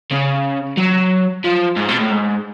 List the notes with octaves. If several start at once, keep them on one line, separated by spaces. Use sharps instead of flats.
C#3
F#3
F3
G#2
B2
A2
G#2